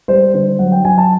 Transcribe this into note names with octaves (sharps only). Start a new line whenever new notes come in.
G3 C5
D3 C5
F#3 F#5
G5
F#3 G#5
A5